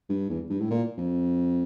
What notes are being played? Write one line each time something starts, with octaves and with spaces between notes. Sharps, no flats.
G2
E2
G2
A2
A#2
F2